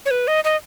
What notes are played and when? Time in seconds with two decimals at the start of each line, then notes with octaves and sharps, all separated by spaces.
0.05 C#5
0.11 B4
0.27 D#5
0.44 D#5